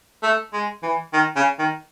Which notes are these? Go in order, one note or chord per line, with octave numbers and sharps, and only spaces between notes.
A3
G#3
E3
D#3
C#3
D#3